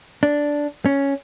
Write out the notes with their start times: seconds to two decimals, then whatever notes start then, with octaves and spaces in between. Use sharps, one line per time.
0.23 D4
0.86 C#4